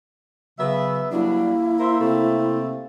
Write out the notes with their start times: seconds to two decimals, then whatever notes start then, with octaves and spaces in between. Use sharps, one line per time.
0.59 C#3 F#3 B3 E5
1.11 F#3 G3 A#3 D4 E4
1.79 A#4 C5 E5
2.01 C3 A3 C4